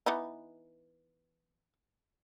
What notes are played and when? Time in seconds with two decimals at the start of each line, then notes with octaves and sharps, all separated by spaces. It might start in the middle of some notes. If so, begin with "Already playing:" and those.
0.06 E3 B3 D#4